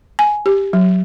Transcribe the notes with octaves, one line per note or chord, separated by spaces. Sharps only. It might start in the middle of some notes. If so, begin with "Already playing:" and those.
G#5
G4
F#3